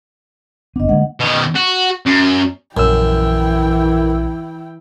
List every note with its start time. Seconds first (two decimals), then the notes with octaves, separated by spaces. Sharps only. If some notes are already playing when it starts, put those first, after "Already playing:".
0.76 F#1 B3 D4 D#5
0.89 D3 G#3 A#3 F#5
1.20 B2 D#3
1.56 F#4
2.06 F#2
2.77 A#1 F#2 E3 E4 G5 E6